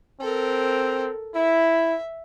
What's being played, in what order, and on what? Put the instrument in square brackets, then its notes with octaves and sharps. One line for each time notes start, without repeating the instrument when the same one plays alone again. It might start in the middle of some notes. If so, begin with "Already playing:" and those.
[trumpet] C4 [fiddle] A4 A#4
[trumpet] E4 [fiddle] E5